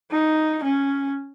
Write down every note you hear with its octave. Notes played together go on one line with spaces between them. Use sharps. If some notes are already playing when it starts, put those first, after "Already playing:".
D#4
C#4